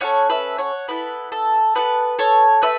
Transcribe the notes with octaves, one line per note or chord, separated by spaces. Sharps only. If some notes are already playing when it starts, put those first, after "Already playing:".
C#4 E4 A4 C#5 F#5
B4 E5
C#5 F#5
B3 E4 A4 B4
A4
B3 E4 A4 B4
A4 C#5
A3 B4 E5